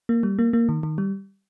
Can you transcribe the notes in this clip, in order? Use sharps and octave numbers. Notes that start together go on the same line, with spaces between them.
A#3
G3
A#3
A#3
D#3
D#3
G3